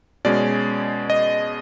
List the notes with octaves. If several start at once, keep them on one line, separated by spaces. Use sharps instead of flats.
B2 G#3 C#4 D5
D#5